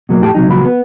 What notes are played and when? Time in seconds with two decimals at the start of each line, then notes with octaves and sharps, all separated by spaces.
0.09 B2 F#3 A3 A#3
0.22 F2 A2 A3 G4 G5 A5
0.35 C3 F#3 D#4
0.48 C#2 A#2 F3 F#3 F#4 B5
0.65 B3